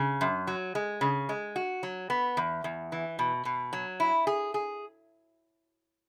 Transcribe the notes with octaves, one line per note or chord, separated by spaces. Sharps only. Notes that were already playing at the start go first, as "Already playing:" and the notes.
Already playing: C#3
F#2
F#3
G#3
C#3
G#3
F#4
F#3
B3
E2
E2
E3
B2
B2
F#3
E4
G#4
G#4